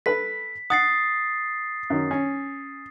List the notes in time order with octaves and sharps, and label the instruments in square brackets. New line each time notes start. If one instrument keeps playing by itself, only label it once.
[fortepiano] A4 B4 B5 [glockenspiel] B6
[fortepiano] F#5 [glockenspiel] D#6 A6 C7
[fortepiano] F#2 D#3
C#4